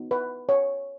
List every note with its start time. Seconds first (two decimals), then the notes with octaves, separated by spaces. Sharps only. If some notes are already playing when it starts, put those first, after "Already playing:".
Already playing: B3 D#4 F#4
0.11 B4
0.49 C#5